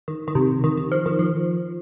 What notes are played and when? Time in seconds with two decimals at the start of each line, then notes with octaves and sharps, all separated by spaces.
0.08 D#3
0.28 D#3
0.35 C3
0.64 D#3
0.77 D#3
0.92 F3
1.06 D#3
1.19 F3